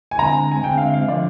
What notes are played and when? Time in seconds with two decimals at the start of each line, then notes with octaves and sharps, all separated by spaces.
0.11 G#5
0.18 D3 G#3 C4 A#5
0.51 G#5
0.63 D3 G#3 C4 G5
0.78 F5
0.94 F5
1.08 D3 F3 D5